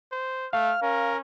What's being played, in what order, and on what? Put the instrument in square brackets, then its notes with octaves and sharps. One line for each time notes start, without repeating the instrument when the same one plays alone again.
[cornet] C5
[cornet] A3 [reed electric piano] F5 [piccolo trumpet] F6
[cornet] C#4 [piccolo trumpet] A#4